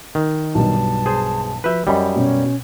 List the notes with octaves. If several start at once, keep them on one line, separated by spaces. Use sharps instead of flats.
D#3
B1 G2 A5
G#4 C5
F3 F#4 B4 E5 G6
F#2 G3 D#5 G#5 B5
B2 C#4